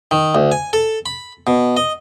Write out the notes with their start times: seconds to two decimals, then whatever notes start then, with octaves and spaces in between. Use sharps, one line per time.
0.11 D#3
0.35 D2
0.52 G#5
0.73 A4
1.06 B5
1.47 B2
1.77 D#5